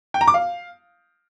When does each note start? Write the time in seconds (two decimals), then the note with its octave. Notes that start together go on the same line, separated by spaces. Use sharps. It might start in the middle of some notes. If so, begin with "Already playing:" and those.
0.14 G5
0.21 A#5
0.28 D6
0.34 F5